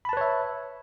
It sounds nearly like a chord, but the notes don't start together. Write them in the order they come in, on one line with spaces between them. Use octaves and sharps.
B5 A5 B4 C#5 E5